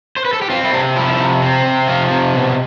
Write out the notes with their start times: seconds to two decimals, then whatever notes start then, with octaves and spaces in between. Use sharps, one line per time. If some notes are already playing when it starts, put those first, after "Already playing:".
0.17 C5
0.25 B4
0.33 A4
0.42 G4
0.50 C4 F4
0.63 E4
0.73 C3 D4
0.96 F3 E4
1.19 C3
1.42 C4
1.65 C3
1.88 F3 F4
2.11 C3
2.34 B2